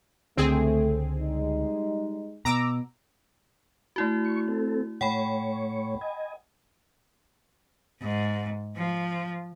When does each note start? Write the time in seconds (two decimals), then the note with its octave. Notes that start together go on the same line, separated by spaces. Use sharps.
0.37 C#2 D3 A3 C4 G#4
1.18 G3 G#3 D#4
2.45 B2 A#5 D6 E6
3.96 A3 E4 F#4
4.25 C#6
4.48 C4 A4
5.01 A2 C#5 F#5 G5 B5
6.01 D#5 G#5
8.01 G#2
8.76 F3